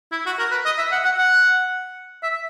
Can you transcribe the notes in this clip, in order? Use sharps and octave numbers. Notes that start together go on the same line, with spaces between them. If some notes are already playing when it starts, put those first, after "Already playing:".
E4
F#4
A#4
B4
D#5
E5
F#5
F#5
F#5
E5